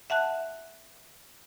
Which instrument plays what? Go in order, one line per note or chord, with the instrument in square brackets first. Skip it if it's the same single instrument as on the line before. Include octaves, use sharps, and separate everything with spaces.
[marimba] E5 F#5 A5 F#6